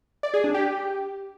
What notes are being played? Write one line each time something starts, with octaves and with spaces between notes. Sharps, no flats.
D5
G#4
D4
G4